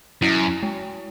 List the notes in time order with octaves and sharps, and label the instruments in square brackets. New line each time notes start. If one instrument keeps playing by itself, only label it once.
[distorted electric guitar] F#2 [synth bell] E4
[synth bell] G#3